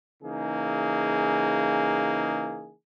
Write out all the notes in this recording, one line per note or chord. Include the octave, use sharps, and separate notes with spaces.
C#3 E3 A#3 D#4 G#4